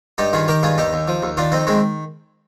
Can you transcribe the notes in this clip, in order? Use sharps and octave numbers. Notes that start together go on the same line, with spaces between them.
G2 D#4 G4
D#3 F4 G#4
D#3 G4 A#4
G2 F4 G#4
D#2 D#4 G4
D#2
F3
D#2
D#3 D4 F4
F2 C4 D#4
D#3 G#3 C4